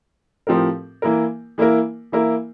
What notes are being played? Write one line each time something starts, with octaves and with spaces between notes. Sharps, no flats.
A2 F3 C4 G4 A#4
E3 A#3 E4 A#4
E3 A#3 E4 A#4
E3 A#3 E4 A#4